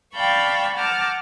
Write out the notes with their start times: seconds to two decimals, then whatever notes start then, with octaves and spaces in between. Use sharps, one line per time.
0.15 D5 F5 G5 A5 B5 C#6
0.75 F#5 A5 A#5 D6 F6 G6